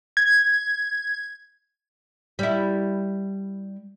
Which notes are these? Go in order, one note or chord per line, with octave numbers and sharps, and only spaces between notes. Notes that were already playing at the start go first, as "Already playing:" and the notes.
G#6
G3 E4